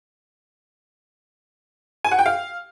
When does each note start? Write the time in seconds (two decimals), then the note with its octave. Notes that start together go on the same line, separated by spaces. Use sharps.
2.05 G#5
2.12 F#5
2.19 G5
2.26 F5